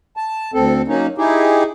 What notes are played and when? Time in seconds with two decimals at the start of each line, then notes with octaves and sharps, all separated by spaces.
0.17 A5
0.54 D2 C4 A4
0.88 F#3 A#3 C#4 D#4
1.18 D#4 E4 G4 G#4